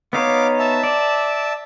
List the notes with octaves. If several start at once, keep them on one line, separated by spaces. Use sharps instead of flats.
B3 D#4 C#5 F5 D6
E5 A5
D5